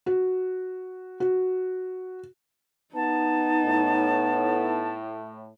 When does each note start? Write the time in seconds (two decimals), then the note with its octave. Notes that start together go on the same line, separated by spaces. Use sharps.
0.06 F#4
1.20 F#4
2.95 B3 D#4 A5
3.65 A2